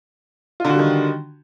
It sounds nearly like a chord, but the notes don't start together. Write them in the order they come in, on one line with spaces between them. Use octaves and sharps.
F4 D3 F#4 G3 D#3